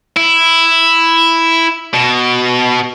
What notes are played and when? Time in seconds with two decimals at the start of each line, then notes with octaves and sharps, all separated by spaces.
0.17 E4
1.94 B2